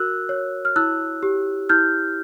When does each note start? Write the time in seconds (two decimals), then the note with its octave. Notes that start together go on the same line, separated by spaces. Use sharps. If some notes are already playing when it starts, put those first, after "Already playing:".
Already playing: F#4 A#4 E6 F#6
0.29 C#5
0.65 F6
0.76 E4 E6 F#6
1.23 G4
1.69 E4 F6 G6